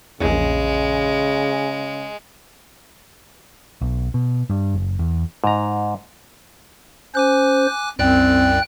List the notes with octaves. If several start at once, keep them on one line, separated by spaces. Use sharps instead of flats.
A#1 E2 C#3 G#3
B1
B2
G2
F#1
E2
G#2 A#5
C#4 C5 G#5 D6 F#6
C2 F#2 C4 D5 G5 F#6